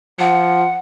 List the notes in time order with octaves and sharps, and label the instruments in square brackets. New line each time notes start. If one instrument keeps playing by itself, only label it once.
[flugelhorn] F3 [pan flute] F#5